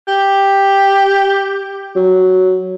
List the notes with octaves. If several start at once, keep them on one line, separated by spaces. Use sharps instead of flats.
G4
F#3